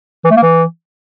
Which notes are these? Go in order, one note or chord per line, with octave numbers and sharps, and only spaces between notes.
E3
A3
A#3
E3